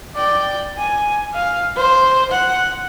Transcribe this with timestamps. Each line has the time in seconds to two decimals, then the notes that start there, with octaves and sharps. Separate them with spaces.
0.16 D5 G5
0.78 G#5
1.34 F5
1.76 C5
2.31 F#5